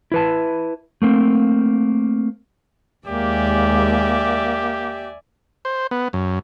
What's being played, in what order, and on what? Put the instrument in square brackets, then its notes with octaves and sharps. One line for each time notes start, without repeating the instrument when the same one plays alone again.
[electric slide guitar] E4 B4 A5
A3 A#3 C4
[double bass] D#2 G#3 [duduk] A#3 [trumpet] G4 [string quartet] D5 E5 G#5
[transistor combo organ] C5
B3
F#2